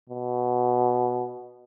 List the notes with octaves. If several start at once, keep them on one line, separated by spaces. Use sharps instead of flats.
B2